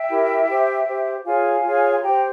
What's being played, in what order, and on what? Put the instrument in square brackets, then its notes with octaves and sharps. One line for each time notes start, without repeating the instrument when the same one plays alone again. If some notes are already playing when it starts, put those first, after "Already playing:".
Already playing: [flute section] E5 G5
E4 G4 A#4
G4 C5
G4 C5
F4 G#4 C#5 F5 G#5
F4 G#4 C#5
C6
G4 C5 G5 A#5